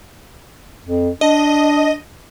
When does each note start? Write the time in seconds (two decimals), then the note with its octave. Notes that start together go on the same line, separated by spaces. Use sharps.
0.85 F2
1.21 D4 D#5